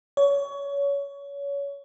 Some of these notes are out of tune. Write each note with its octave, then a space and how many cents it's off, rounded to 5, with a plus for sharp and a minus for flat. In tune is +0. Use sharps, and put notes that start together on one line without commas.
C#5 +25